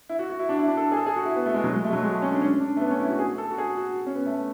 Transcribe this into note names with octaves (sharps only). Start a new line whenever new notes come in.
E4
F#4
F#4
E4
D4
E4
D4
A4
G#4
A4
G#4
F#4
E4
B3
A3
G#3
F#3
G#3
A3
G#3
F#3
G#3
A3
C#4
D4
C#4
D4
A3
B3
C#4
E4
F#4
G#4
A4
F#4
G#4
F#4
C#4
B3
A3